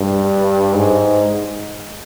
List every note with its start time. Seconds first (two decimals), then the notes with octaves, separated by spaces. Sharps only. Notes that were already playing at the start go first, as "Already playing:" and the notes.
Already playing: G2
0.75 G#2